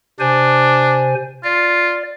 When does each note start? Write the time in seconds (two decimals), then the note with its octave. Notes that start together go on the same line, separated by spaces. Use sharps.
0.20 C3 D4 C5 G#5
1.44 F4 D5